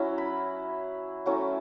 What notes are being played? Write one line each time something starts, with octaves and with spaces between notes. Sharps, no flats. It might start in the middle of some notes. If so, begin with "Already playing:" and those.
Already playing: F#3 C#4 E4
B5
F#3 A3 C#4 E4